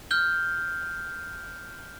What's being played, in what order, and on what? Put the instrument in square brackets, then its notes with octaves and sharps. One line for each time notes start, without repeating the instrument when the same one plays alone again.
[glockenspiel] F6 G6 G7